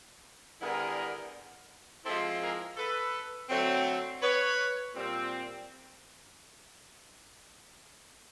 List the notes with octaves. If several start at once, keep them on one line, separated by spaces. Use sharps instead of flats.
D3 G3 B3 E4 G#4 A#4
F3 G#3 C4 E4 G4 A4
G#4 A#4
A4 B4
D3 F#3 A3 C4
B4 C#5
A#2 G3 C4